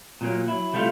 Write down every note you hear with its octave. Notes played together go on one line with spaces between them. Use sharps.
A#2 F#3 A#3
F#3 E4
C2 G3 A3 E4 F4